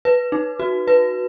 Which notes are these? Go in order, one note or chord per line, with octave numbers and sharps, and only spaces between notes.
B4
D#4
F#4
B4